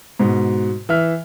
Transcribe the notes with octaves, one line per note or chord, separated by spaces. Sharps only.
G#2 B2
E3 E5 F6